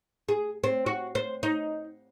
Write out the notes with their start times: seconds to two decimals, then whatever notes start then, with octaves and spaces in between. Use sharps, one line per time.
0.28 G#4
0.64 C4
0.86 F#4
1.15 C5
1.43 D#4